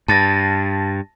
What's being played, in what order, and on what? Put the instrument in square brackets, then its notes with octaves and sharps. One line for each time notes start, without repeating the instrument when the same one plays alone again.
[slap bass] G2 [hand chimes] A5 A6 A#6